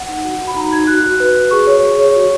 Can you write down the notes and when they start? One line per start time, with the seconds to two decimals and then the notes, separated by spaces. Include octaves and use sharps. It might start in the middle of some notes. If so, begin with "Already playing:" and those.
Already playing: F#5
0.08 D#4
0.24 F#4
0.40 F#4
0.48 B5
0.55 D#4 A#5
0.71 D#4 G#6
0.87 F#4 F#6
1.04 F#4
1.20 B4
1.35 F#4
1.51 G#4 C#6
1.67 C#5
1.83 G#4
1.99 C#5
2.16 F#4